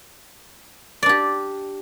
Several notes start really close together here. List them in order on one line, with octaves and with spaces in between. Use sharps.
D5 D4 G4